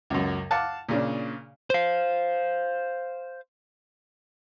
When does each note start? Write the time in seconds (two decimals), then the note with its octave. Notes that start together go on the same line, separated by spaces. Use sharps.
0.10 C#2 F#2
0.51 F5 F#5 A5 D6
0.89 A#2 C#3 D4
1.70 C5 F5